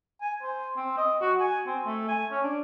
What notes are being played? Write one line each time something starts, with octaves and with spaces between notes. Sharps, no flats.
G#5
C5
C4
D#5
F#4
G#5
C4
A3
G#5
C#4
D4